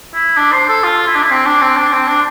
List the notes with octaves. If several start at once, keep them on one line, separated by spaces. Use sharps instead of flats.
E4
D4
C5
A4
F4
E4
D4
E4
C4
D4
C4
D4
C4
D4